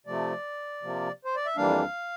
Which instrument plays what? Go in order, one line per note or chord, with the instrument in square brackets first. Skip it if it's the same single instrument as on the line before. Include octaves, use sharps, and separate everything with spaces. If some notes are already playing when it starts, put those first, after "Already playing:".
[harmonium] C3 F3 A3 D5
C3 F3 A#3
C5
D5
E5
F2 E3 G3 A#3 D4 F5